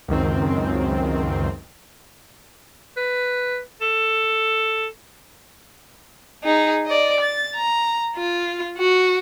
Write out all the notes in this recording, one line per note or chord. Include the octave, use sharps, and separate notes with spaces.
C#2 F#2 D#3 C4
B4
A4
D#4 G#4
D5 D#5
A6
A#5
F4
F#4